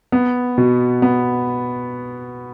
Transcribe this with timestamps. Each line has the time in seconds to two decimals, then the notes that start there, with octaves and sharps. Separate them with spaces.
0.12 B3
0.58 B2
1.02 B3